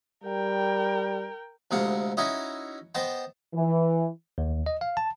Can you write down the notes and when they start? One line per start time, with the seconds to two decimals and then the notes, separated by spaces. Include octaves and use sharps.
0.24 G3 A#4 G5
1.71 D2 C3 G#3 F4 F#5
2.17 C#4 D#4 E4 F#4 C#5 D#5
2.95 B3 C5 D#5 G5 A5
3.54 E3
4.38 D#2
4.66 D#5
4.81 F5
4.97 A5